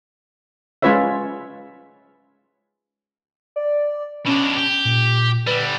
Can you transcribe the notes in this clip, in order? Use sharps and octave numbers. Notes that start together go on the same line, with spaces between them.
G#3 C#4 F4 B4 C#5 E5
D5
B2 C#4 D4
G4
A#2
D3 G3 B4